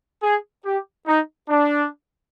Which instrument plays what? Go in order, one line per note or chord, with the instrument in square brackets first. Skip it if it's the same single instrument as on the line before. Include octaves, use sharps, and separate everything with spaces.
[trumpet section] G#4
G4
D#4
D4